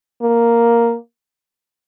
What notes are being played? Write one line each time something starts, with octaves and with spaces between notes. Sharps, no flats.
A#3